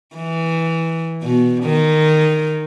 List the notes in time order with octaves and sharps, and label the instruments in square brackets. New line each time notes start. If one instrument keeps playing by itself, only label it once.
[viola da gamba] E3
B2
D#3